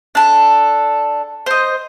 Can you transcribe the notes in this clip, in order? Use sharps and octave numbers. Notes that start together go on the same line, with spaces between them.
D4 A4
C5 D#5